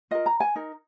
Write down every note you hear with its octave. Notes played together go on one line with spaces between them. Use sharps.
F4 A#4 D#5
A#5
G#5
D#4 A#4